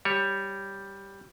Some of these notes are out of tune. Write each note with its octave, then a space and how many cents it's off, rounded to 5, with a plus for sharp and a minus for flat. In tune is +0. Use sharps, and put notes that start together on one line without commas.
G3 +0 G4 +0 C#5 +0